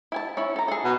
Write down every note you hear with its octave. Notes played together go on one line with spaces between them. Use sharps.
E4 G#5 A5
C#4 E4
A4 A#5
G#4 A4
B2